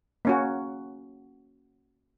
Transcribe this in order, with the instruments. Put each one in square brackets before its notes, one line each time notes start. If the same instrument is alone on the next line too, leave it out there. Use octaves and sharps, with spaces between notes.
[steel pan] A#3 C#4 F#4